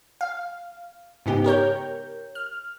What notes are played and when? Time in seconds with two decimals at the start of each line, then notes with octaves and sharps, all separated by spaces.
0.21 F5
1.26 G#2 C#3 B3 D#4 G4
1.44 G4 A#4 C#5 G6
2.35 F6